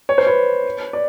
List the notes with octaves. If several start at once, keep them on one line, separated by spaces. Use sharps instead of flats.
C#5
C5
B4 C#5
D5